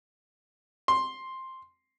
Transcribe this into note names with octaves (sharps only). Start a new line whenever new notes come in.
C6